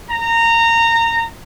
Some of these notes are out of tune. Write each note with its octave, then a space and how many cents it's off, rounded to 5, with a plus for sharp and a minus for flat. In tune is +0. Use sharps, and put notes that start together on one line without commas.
A#5 -20